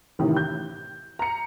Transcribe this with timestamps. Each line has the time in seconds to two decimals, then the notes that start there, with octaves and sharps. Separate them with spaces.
0.19 A1 A2 C3 D#3
0.37 G6
1.19 A#5 C#7